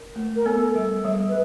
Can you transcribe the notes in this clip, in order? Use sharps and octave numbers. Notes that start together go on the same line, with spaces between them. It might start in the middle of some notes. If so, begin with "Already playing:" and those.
Already playing: A#4
A3
A#4
B3 A4
G3
G3
B4